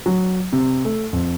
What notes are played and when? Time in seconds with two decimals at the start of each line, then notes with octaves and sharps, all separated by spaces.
0.06 F#3
0.53 C3
0.85 A3
1.13 F2